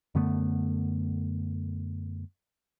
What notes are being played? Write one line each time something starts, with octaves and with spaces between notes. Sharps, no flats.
F#2 D3 A3 B3